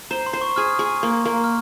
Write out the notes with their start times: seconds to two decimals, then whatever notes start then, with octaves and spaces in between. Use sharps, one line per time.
0.11 C5 A#5
0.26 C6
0.33 C5
0.41 C#6
0.56 G#4 F6
0.79 G#4
1.03 A#3
1.25 A#3
1.44 F6